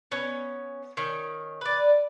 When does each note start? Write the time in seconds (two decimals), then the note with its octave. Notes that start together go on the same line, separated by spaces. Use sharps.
0.12 B3 C#4
0.97 D#3 C#4
1.61 B4 D5